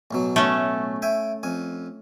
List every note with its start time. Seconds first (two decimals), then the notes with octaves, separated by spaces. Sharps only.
0.11 A1 B2 F#3
0.36 A3 C#4
1.02 E5 G5 G#5
1.43 F2 G#5